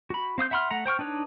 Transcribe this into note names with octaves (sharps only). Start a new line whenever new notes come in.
F#4 B5
C4 F5 D#6 G6
E5 F#5 B5 C6 F6
A3 F#5 A#5
C5 G5 C#6 F6
D4 D#4 B4 C#5